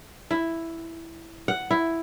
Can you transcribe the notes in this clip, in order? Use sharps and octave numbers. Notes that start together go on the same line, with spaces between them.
E4
F#5
E4